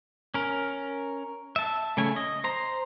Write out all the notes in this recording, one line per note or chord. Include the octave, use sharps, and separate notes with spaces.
C#4 A#4
E5 A5
C#3 A3 C#4 G#5
D#5
C5 A#5